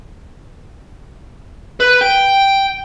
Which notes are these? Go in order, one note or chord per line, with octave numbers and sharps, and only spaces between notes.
B4
G5